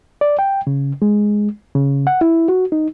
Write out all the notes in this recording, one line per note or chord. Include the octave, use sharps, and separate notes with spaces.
D5
G5
C#3
G#3
C#3
F#5
E4
F#4
D#4